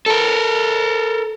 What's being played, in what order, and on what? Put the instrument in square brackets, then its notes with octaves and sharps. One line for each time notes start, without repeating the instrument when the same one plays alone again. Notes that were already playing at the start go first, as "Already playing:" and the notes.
[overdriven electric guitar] A4 A#4